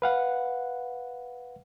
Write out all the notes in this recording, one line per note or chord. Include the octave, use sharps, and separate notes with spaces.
B4 F5 F#5